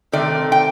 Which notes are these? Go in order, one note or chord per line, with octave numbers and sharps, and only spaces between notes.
C3 D#3 A3 C4 D5
G5